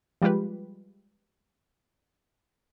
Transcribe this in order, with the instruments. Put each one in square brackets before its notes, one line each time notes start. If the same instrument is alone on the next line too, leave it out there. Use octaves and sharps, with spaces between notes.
[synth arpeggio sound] F3 G3 G#3 F4 G4 B4